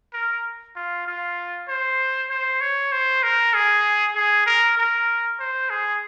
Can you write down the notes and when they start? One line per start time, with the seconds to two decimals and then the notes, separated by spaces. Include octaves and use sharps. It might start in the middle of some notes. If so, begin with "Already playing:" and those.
0.14 A#4
0.76 F4
1.07 F4
1.68 C5
2.30 C5
2.61 C#5
2.92 C5
3.23 A#4
3.54 G#4
4.15 G#4
4.46 A#4
4.77 A#4
5.39 C5
5.70 G#4